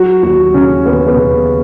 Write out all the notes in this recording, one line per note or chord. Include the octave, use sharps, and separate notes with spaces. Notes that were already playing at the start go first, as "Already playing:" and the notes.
Already playing: F#3 F#4
D#2 F#4
C#3 C#4
D#2 B3
B3
C#3